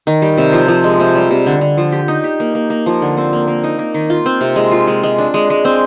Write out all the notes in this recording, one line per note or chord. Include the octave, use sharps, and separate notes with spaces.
D#3
G3
C3
F3
F3
G#3
C3
G3
C3
D3
D3
F3
G4
D#4
G4
A#3
A#3
A#3
F3
D3
C4
A#3
A#3
D#4
A#3
D#3
F4
C4
C3
G#3
F4
G#3
G#3
D4
G#3
G#3
C4